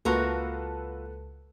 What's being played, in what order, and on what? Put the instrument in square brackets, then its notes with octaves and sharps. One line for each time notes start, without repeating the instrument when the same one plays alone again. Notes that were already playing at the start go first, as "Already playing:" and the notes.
[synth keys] C#2 [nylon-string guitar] A#3 F4 F#4 [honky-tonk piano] A4 B4 A5